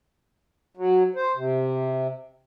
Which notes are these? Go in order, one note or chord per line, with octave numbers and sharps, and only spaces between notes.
F#3
C5
C3